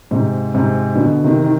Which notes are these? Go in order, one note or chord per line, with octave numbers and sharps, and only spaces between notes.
G#2 C3
G#2 C3
B2 D3
C3 D#3
D#3